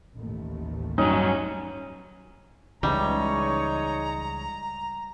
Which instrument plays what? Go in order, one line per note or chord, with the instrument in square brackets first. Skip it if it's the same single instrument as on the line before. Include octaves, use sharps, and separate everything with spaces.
[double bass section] A1 D#2 A3
[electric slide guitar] G2 F#3 [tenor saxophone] C#4 [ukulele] D#4
[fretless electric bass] C#2 C#3 E3 [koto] G3 [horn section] G#3 D#4 C#5 [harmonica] A#5